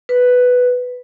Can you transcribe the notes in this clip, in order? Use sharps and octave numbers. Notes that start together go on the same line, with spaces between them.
B4